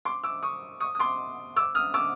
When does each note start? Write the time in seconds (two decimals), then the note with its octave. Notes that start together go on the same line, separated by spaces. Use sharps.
0.05 C6 D6
0.24 D6 E6
0.43 C#6 D#6
0.80 C#6 D#6
0.95 D#6
1.00 C6 D6
1.56 D6 E6
1.75 D#6 F6
1.94 D6 E6